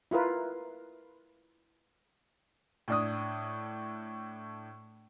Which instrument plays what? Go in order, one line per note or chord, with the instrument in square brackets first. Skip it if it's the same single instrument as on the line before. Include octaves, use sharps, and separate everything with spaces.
[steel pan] E4 F4 A#4 B4
[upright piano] A2 D4 D#6